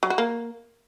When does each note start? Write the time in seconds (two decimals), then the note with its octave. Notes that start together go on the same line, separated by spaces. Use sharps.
0.03 F#3
0.10 F#4
0.18 A#3